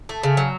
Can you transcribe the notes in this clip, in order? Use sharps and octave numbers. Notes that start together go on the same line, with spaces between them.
A3
C#3
F#3